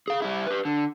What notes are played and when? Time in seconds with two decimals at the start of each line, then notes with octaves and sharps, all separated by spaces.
0.08 G#4 F5
0.22 G3 E4
0.46 G4 B4
0.65 D3